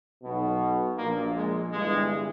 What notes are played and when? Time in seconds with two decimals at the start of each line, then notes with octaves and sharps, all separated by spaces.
0.23 B1 B2
0.98 A#1 A#2 A#3
1.34 G#3
1.71 G1 G2 E3 G#3